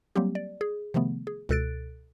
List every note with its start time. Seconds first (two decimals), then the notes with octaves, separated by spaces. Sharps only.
0.16 F#3 G3 A#3 C4 G4
0.35 D5
0.61 G#4
0.94 C3 D#3 F3 A3 B3
1.27 G#4
1.49 C#2 B2 A4 F#6 A6 D7